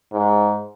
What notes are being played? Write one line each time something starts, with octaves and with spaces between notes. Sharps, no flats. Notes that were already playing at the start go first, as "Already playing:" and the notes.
G#2